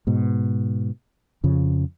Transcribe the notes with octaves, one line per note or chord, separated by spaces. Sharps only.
G#2 B2
F2 C#3 F3